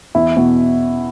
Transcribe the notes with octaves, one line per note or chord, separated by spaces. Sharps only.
E2 E4
B2